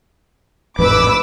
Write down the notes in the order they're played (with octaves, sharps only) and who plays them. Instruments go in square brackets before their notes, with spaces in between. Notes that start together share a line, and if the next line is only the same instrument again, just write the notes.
[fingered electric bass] A1 F2 G#2 [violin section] B4 D6 E6